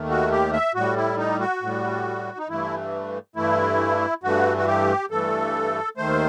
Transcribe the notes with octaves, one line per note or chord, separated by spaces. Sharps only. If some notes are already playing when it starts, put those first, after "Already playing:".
Already playing: D#2 D#3 A3
F#4
G4
E5
A2 G3 F#4
E4
D#4
F#4
A2 G3
D#4
G2 E3 A3 E4
G2 E3 A3 E4
G2 E3 A3 F#4
F#4
G4
G2 E3 A3 A4
D#2 D#3 A3 C5